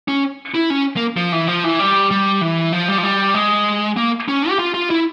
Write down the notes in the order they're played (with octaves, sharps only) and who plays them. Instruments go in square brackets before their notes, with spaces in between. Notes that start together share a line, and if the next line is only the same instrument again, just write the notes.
[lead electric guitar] C#4
E4
C#4
A#3
F3
E3
F3
E3
G3
G3
E3
F3
G3
F3
G3
G#3
A#3
C#4
G4
F4
F4
E4